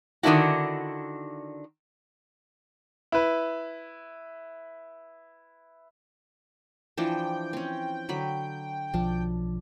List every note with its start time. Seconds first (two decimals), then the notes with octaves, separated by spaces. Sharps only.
0.23 D3 D#3 A#3 D4 E4 F#4
3.12 E4 B4
6.97 E3 F3 D4 G5
7.53 C4 C#4
8.09 D3 F#3 B5
8.94 B1 F3 D4